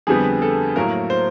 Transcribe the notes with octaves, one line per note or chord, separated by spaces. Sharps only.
F2 D3 G3 B3 G#4
A4
A2 F#3 A#3 A#4
C5